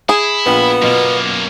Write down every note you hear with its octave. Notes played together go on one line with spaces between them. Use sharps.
E4 G#4
A#1 B3 F4 G5
F#2 B2 A#3 F4